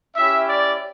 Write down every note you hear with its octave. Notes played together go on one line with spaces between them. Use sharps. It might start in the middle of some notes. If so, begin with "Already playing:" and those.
C#4 E4 G4 E5
D5